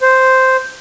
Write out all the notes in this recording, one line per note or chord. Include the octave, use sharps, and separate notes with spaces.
C5